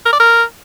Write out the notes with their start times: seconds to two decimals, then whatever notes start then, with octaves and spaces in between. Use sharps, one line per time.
0.06 A#4
0.13 D5
0.20 A#4